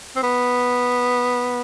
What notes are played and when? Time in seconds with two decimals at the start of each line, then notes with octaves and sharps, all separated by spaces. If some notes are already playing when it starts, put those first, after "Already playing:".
0.16 C4
0.23 B3